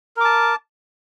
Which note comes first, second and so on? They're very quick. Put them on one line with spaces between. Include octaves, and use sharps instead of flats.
A#4 D6 A5